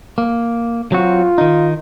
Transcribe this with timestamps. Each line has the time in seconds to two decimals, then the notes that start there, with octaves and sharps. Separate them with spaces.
0.18 A#3
0.92 F#3 C4 F4 F#4
1.38 D#3 D#4